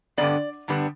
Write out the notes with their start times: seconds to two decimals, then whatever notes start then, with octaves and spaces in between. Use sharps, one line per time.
0.17 G2 D3 G3 B3 D5
0.68 G2 D3 G3 B3